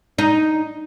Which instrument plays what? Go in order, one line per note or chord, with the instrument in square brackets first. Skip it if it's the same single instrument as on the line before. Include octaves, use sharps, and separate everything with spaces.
[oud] D#4